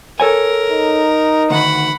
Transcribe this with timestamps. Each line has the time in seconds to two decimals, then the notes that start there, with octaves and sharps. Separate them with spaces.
0.20 A4 A#4 C#5 G#5
0.71 D#4
1.50 D2 D#3 F#5 B5